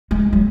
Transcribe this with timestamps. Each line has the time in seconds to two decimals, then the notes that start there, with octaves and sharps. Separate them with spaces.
0.11 G#3
0.33 F#3